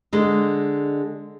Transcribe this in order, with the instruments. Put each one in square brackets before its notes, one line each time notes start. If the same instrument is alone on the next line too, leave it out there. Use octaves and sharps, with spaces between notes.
[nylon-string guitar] D3 G#3 D#5